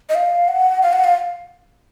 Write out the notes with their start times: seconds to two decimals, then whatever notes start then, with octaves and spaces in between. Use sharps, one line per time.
0.09 D#5
0.15 F5
0.48 F#5
0.83 F5
0.93 F#5
1.04 F5